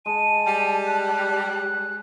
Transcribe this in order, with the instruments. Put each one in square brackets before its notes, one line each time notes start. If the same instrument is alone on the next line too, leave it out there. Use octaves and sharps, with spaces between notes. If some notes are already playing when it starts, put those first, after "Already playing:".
[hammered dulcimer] G#3 [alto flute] A5 [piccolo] D#7
[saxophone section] G3
[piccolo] F#6